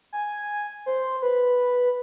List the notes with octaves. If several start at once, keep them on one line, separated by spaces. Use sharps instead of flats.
G#5
C5
B4